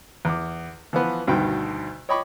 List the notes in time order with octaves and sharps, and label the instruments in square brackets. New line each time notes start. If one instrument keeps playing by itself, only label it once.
[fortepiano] E2 D6
E3 F3 B3
D2 G2 B2 D#3 G5
C#5 D#5 G5 B5 C#6 D6